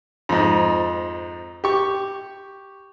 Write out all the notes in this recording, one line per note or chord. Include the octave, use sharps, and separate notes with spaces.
F2 G#2
G4 C#6